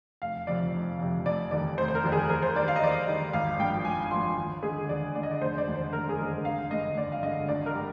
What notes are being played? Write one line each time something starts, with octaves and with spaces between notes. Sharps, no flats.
F1 F5
F2 C3 D5
F1
F2 C3
F1 D5
D#2 D#3 G3 D5
F1 C5
C5
A#4
D#2 D#3 G3
G#4
D#2 A#4
C5
D#3 G3 D5
F5
D#5
D#2 D5
D#5
D#3 G3
G#1 F5
G2 F3 G5
G#1 G#5
G2 F3 C6
D#2
D3 G#3 G#4
D#2 D5
D3 G#3 D5
D#5
D5
F1 C5
D5
D#2 D3 G#3
C5
F1 A#4
G#4
D#2 D3 G#3 A#4
G#1 F5
G2 D3 G#3 D#5
G#1 D5
F5
G2 D3 G#3 D#5
G#1 D5
A#4
G3